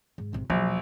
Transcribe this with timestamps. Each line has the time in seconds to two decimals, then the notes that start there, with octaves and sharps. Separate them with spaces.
0.18 G#2
0.33 G#1 C3
0.50 E1 A#1 F#3